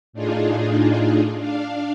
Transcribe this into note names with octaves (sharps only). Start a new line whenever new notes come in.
A2 D4 D#4 F4 G#4
D4 F5